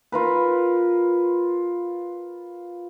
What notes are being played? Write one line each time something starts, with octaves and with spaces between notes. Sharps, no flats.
F4 A#4 B4